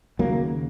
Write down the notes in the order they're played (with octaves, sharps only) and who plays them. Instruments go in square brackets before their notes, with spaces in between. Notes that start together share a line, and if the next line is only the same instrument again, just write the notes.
[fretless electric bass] D#2 C#3 F#3 A#3